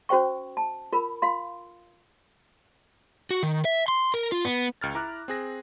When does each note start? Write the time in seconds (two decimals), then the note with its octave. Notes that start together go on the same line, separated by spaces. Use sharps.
0.09 C#4 F#4 C5 G5 C#6
0.57 A5
0.93 F4 A#4 B5
1.22 F4 F5 C6
3.31 F#4
3.43 D#3
3.65 E5
3.88 C6
4.14 A#4
4.32 F4
4.45 B3
4.81 C#2 F6 A6
4.94 E4 A#5 D6 F6 F#6
5.28 C4 G#4 A#6